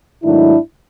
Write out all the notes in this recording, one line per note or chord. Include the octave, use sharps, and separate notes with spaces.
G#2 D#3 F#3 A3 D4 E4